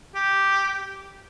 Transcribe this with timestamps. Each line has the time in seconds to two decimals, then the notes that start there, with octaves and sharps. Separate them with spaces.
0.15 G4